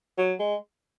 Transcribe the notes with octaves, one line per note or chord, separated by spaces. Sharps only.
F#3
G#3